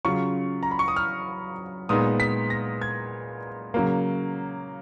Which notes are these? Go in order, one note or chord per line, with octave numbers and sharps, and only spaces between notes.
C#3 F#3 C#4 F4 C#6
A#5
B5
C#6
D#6
F6
A#2 G#3 B3 D#4 D#6
B6
A#6
G#6
C#3 F#3 A#3